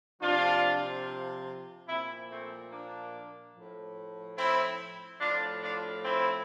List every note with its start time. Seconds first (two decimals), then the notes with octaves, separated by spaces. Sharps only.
0.20 C3 F3 D4 F4
1.87 A#2 F3 C4 E4
2.29 A3 C4
2.71 A#3 D4
3.54 A2 F3
4.37 C4 E4
5.20 A2 F3 D4 F4
5.62 D4 F4
6.03 C4 E4